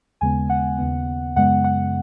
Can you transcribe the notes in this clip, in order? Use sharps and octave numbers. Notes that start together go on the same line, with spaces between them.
D#2 C#3 G#3 B3 G#5
F#5
D#2 C#3 B3
F#2 C#3 G#3 B3 F#5
F#5